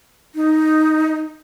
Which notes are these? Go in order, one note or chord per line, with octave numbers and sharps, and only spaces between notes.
D#4